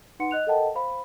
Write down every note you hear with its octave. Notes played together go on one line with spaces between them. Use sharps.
D#4 B4 F#5 C6 C#7
D#5 F#6 F7
A4 A#4 D#5 F#5 G5 A5
C5 F5 B5